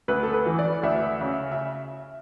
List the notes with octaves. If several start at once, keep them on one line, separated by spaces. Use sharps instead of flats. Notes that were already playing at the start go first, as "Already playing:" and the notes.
D2 B4
A4
B4
E3
D5
D2 E5
C#3
E5